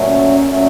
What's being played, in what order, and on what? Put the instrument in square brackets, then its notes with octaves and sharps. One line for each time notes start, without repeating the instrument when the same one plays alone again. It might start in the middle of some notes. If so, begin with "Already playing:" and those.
Already playing: [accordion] A#2 F#3 A3 [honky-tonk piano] C#4
[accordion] A#2 F#3 A3